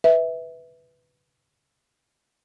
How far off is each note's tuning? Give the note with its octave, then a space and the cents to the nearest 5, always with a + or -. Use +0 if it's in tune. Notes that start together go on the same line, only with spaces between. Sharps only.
B4 +0 E5 -15